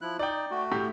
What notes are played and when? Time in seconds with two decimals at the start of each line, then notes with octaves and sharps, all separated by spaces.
0.01 F3 E4 F#6
0.19 D#4 D5 G5
0.51 A3 F#4
0.72 A2 G4